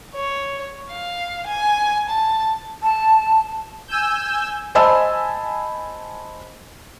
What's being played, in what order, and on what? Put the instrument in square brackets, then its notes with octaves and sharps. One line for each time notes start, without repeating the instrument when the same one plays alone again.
[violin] C#5
F5
G#5
A5
[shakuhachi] A5
[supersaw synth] G#5 E6 G6
[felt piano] C5 D#5 G#5 A5 B5 E6